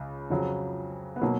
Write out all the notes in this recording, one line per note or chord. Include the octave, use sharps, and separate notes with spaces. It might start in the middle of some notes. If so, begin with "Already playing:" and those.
Already playing: C#2 C#3
F2 C#3 F#3
B3
B2 F#3 A#3